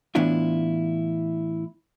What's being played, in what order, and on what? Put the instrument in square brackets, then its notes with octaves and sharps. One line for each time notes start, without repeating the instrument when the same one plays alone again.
[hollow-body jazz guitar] A2 E3 B3 D4 E4 F4